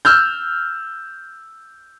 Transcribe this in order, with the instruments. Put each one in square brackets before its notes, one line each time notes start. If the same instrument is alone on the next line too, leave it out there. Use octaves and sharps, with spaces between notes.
[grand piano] E6 F6 G6